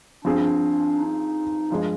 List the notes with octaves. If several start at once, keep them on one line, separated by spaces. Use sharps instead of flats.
G2 F3 C4 D4 F4 G#4
D#4
G2 F3 G#3